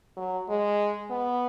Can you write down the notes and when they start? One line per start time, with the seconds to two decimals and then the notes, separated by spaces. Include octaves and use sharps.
0.17 F#3
0.49 G#3
1.11 B3